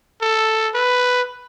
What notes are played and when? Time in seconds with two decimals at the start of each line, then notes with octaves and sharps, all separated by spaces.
0.22 A4
0.75 B4